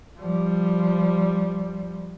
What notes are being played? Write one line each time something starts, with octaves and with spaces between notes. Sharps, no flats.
F3 G3